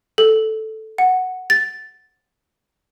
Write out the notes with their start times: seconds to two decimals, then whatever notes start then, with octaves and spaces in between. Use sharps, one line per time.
0.18 A4
0.98 F#5
1.50 A6